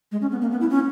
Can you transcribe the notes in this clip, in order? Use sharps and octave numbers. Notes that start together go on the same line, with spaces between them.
G#3
C#4
B3
A#3
B3
E4
C#4